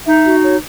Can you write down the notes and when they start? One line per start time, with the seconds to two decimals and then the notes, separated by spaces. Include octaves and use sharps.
0.06 D#4 E5
0.25 F#4
0.42 C#5